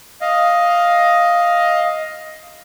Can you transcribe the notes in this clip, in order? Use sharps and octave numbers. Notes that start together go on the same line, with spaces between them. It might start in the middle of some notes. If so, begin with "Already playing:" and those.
D#5 F5